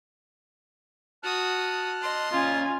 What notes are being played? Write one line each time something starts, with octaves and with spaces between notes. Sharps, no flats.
F#4 A5 D#6 F6 F#6
D#5 C6
A#2 C#3 C#4 F4 G#5